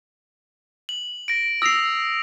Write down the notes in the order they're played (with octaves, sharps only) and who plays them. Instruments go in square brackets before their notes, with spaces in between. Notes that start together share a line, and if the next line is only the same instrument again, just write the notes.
[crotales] F#7
A#6 D7
[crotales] D#6 A#6 F7 [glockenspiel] E6 C7